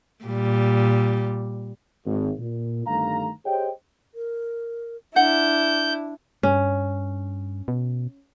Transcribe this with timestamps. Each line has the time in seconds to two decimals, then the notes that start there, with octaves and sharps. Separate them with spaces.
0.24 A#2 G3
2.06 G#1
2.38 A#2
2.87 G1 G2 D#3 A3 F5 A#5
3.45 G4 G#4 C5 C#5 D#5 G5
4.15 A#4
5.16 D4 E4 F#5 G6
6.43 G2 C#4
7.68 B2